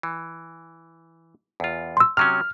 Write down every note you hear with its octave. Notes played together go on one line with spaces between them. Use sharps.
E3
E2 F4
C6 E6
C3 F#3 C#4 F6